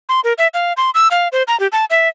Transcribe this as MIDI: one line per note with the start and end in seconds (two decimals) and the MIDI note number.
0.09 0.20 84
0.24 0.33 70
0.38 0.48 76
0.54 0.73 77
0.77 0.90 84
0.95 1.08 88
1.11 1.28 77
1.32 1.43 72
1.48 1.59 82
1.60 1.67 67
1.72 1.85 81
1.90 2.09 76